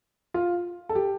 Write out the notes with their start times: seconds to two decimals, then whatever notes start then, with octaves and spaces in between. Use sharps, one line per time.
0.34 F4
0.89 A4
0.95 G4